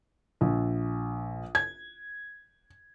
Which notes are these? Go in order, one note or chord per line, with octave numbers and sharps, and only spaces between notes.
A#1
G#6